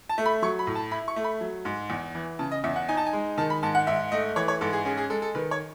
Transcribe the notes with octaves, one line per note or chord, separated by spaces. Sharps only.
A5
A3
B5
F#3 C#6
B5
A2
A5
E4 B5
C#6
A3
B5
F#3
G#2
E2
E3
C#3 A5
D#5
E2 E5
F#5
D#4 G#5
A5
G#5
G#3
D#3 A5
B5
G#2 A5
F#5
G#2 E5
A3 D#5
E3 C#5
C#5
G#2 A4
G#4
C#4 G#4
G#4
G#3 A4
A4
D#3 B4
C#5